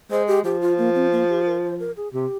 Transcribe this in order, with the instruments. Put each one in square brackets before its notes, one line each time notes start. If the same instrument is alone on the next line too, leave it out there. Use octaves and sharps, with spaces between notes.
[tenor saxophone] G#3 [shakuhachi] C5
[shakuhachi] G4
[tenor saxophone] F3 [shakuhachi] G4
[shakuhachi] F4
A#3
C4
A#3
G4
A#4
C5
A#4
G#4
[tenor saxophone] C3 [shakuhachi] G4